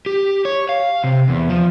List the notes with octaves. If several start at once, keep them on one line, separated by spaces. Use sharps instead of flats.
G4
C#5
F5
C3
E2
F3